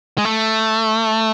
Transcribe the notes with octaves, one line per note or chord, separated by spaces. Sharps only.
G#3
A3